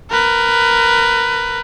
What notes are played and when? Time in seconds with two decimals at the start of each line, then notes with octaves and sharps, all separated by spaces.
0.11 A#4 B4